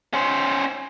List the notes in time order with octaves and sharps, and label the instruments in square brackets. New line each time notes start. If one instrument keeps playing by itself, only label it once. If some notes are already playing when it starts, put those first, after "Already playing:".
[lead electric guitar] C#4 C5